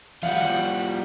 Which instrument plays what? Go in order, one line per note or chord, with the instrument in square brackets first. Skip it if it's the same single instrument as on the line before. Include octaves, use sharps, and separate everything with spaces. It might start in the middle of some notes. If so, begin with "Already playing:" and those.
[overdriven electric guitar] F3 G3 [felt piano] F5 [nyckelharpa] F#5